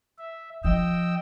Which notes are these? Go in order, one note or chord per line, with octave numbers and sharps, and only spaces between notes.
E5
F3 D#5 G5 E6